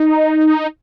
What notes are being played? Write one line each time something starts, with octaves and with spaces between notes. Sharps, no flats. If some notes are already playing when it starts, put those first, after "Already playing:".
Already playing: D#4